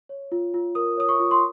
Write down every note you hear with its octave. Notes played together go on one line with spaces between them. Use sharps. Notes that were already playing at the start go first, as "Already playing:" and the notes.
C#5
F4
F4
A#4 D#6
C#5 D#6
C#6
F4
C6